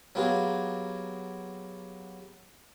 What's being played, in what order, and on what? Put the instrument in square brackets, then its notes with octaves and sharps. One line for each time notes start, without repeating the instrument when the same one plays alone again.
[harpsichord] F#3 A#3 B3 F4 G4 G#4